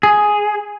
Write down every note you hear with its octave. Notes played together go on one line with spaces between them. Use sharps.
G#4